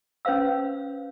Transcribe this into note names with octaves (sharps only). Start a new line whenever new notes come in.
C#4 B4 C5 F5 E6